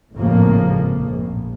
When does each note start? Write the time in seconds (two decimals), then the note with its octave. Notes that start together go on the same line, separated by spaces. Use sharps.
0.13 G#1 F2 A2 C#3 F3 A#3
0.99 A#1